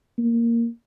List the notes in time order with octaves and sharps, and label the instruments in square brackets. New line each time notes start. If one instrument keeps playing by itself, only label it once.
[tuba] A#3